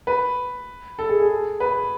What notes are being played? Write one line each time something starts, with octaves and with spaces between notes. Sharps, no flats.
B4
A4
G#4
G#4
B4